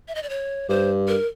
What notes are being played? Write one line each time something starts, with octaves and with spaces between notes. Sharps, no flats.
E5
D#5
D5
C#5
G2 C5
A#4